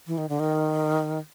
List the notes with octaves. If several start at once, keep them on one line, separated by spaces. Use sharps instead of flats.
E3
D#3
D3
D#3